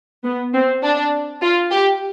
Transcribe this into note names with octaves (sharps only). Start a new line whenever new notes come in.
B3
C4
D4
F4
G4